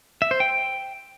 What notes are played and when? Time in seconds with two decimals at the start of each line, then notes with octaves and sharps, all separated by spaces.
0.22 E5
0.31 C5
0.40 G5